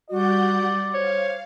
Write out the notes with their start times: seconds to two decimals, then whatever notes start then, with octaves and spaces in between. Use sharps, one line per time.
0.10 G3 F#4 D5 F#5 G6
0.94 C5 C#5 F5